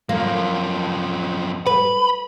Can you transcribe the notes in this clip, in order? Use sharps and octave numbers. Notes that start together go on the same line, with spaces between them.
F#2 F3 A#3
B4 B5